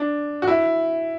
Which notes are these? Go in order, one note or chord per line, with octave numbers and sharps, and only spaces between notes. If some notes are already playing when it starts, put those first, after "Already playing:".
Already playing: D4
F#4
E4